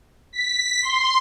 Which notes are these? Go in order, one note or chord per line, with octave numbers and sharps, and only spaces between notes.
B6
C6